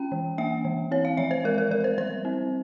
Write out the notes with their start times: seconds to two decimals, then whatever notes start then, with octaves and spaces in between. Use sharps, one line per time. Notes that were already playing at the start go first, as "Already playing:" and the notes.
Already playing: C#4 G5
0.12 E3
0.38 A#3 E5
0.65 E3
0.91 C4 C#5
1.05 F5
1.17 F3 E5
1.31 C5
1.44 G#3 A#4
1.58 A#4
1.70 F3 A#4
1.84 C5
1.98 G3 C5
2.25 C4